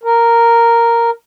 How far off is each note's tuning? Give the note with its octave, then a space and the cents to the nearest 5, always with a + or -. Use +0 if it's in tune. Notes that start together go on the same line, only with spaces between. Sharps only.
A#4 -5